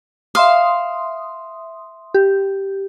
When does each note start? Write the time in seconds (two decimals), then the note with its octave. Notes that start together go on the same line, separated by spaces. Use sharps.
0.35 E5 F5 C6 D#6
2.14 G4